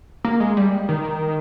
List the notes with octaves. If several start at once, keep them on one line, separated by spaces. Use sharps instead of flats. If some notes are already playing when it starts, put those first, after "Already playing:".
A#3
G#3
G3
D#3